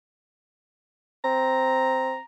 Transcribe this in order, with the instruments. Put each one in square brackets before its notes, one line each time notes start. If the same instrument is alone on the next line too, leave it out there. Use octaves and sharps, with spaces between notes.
[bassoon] C4 [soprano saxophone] A#5